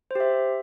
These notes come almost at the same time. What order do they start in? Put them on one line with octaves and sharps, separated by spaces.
C5 G4 E5